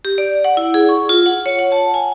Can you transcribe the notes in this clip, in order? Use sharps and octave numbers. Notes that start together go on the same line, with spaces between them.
G4
D5
F#5
E4
G#4
C#6
F4
F#5
C#5
F#5
A5
G#5